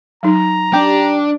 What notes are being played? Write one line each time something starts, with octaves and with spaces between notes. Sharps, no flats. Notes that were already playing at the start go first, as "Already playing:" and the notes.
F#3 D#4 A#5
D4 G4